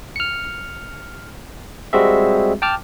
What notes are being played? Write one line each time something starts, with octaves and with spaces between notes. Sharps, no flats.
F6 C#7
G3 G#3 C4 F#4 G#4 E5
G5 A5 D6 F6